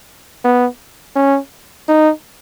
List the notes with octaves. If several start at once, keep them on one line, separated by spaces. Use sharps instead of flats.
B3
C#4
D#4